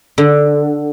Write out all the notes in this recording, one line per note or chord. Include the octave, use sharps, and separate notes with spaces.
D3